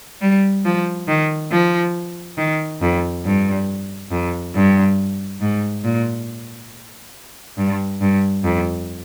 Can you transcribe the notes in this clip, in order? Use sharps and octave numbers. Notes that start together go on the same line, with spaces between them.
G3
F3
D#3
F3
D#3
F2
G2
F2
G2
G#2
A#2
G2
G2
F2